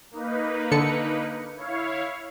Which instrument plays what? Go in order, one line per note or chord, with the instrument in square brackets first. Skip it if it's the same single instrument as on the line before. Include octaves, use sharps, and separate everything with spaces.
[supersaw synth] A#3 D#4 B4
[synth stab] D3 A4 C#7
[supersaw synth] E4 C#5 F5